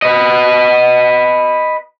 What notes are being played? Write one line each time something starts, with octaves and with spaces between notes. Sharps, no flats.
B4 D#5